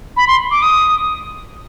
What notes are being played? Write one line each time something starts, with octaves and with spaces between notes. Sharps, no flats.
B5
C6
D6
D#6